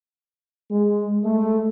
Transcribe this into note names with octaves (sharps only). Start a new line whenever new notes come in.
G#3
A3